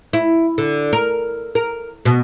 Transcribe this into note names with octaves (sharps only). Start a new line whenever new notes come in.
E4
D3
A#4
A#4
B2